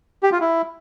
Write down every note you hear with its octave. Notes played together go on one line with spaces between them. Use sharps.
G4
F4
E4